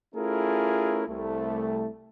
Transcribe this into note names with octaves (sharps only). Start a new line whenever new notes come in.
A3 C#4 E4 F4 G#4 A#4
C2 A3